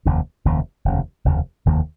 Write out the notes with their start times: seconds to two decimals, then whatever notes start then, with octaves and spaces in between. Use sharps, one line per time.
0.05 F1 D#2 C#3
0.45 F1 D#2 C#3
0.85 F1 D#2 C#3
1.25 F1 D#2 C#3
1.66 F1 D#2 D#3 A#3